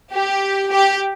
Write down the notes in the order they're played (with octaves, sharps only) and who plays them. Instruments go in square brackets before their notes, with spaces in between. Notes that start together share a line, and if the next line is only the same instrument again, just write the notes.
[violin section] G4
G4